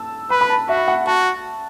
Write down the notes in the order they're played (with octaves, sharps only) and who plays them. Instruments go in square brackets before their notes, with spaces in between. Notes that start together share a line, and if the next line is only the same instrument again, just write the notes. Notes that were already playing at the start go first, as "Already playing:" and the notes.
Already playing: [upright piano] A5 E6
[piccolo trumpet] B4 [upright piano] B5
[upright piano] B5
A5
[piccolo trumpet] F#4 [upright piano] E5
[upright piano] F#5
[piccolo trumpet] F#4 [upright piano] A5